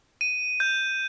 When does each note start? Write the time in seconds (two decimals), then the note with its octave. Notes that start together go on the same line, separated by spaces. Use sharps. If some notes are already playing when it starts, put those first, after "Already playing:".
0.21 D#7
0.60 G6